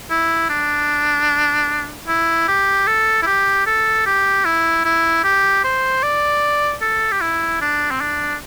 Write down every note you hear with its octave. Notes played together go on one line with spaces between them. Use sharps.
E4
D4
E4
G4
A4
E4
G4
A4
G4
E4
E4
G4
C5
D5
A4
G4
E4
D4
C4
D4